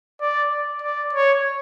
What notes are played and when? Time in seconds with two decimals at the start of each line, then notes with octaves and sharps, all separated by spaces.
0.21 D5
0.82 D5
1.13 C#5